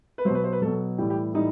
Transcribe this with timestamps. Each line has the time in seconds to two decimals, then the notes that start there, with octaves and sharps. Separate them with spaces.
0.18 B4
0.25 F#3 C5
0.30 B2 B4
0.44 C5
0.53 B4
0.62 B2 F#3 A4
0.98 A2 E3 G3 G4
1.10 G4
1.34 A2 E3 G3 D#4